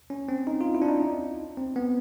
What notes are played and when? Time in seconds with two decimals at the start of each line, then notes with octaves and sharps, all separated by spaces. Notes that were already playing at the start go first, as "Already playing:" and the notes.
0.10 C#4
0.29 C4
0.47 D#4
0.61 F4
0.75 E4
0.82 D4
0.89 D#4
1.58 C4
1.76 B3